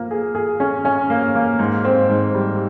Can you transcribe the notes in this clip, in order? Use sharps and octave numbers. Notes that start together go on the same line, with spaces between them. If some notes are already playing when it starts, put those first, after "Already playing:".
Already playing: F3 A#3
G#4
G#4
C#4
C#4
A#3
A#3
G#2
C4
G#2
G3